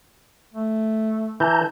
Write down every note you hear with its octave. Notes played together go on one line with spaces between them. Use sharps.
A3
E3 A5 A#5 G6